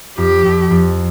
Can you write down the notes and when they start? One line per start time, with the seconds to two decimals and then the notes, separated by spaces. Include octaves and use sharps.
0.18 F2 G4
0.45 F2
0.71 F2